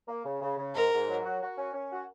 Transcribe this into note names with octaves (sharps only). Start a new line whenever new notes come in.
A#3
C#3
C#3
C#3
G#2 A#4
G#2
F#3
F#4
F#4
C#4
C#4
F#4